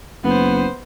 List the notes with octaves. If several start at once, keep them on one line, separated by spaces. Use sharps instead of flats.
F#1 B3 C5